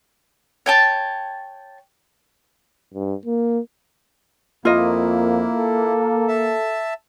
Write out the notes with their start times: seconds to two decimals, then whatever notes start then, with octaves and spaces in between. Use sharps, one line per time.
0.66 C#5 G5 A5
2.94 G2
3.26 A#3
4.65 F2 A#3 E4 F4 D#5
5.55 A4
6.28 E5 A5